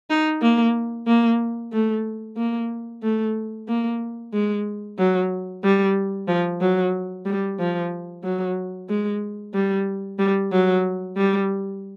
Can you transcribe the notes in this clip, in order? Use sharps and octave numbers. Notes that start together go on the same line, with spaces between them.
D#4
A#3
A#3
A3
A#3
A3
A#3
G#3
F#3
G3
F3
F#3
G3
F3
F#3
G#3
G3
G3
F#3
G3